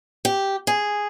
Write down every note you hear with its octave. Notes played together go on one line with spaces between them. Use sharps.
G4
G#4